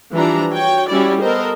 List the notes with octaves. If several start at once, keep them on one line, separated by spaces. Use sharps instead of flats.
E3 F3 G3 D4 A#5
F#4 C#5 G5
G3 C#4 E4 F#4 D5
B3 A4 A#4 C5 D#5